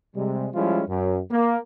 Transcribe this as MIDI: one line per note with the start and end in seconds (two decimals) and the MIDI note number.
0.15 0.48 48
0.15 0.48 55
0.15 0.48 56
0.54 0.82 53
0.54 0.82 55
0.54 0.82 56
0.54 0.82 61
0.54 0.82 64
0.54 0.82 65
0.87 1.20 42
1.31 1.58 58